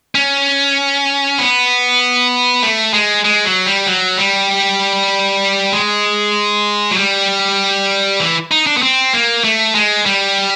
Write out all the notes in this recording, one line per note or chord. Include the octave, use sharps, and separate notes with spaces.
C#4
B3
A3
G#3
G#3
F#3
G3
F#3
G3
G#3
F#3
G3
E3
D#4
D4
B3
C4
A#3
A3
G#3
G3